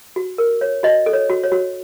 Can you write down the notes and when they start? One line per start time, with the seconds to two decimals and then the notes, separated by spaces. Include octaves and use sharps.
0.16 F#4
0.38 A#4
0.61 C#5
0.83 F#4 D#5
1.06 A4
1.13 C#5
1.30 F#4
1.43 C#5
1.52 F#4